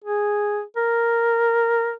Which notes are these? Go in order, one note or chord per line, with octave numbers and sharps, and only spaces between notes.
G#4
A#4